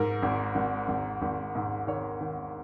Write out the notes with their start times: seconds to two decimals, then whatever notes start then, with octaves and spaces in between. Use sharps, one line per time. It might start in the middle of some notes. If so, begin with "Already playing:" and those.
Already playing: G#2 A#4
0.22 G#1
0.55 G#1
0.88 G#1
1.22 G#1
1.55 G#2
1.87 D#3 C#5
2.21 D#3